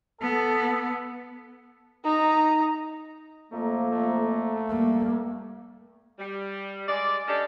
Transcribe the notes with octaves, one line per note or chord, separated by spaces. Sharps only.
B3 A4
D#4 A#5
F2 A3 A#3 A#5
A3
G3 A#3
G3
G#3 D5
C#4 D4 G4 A4 D5 D#5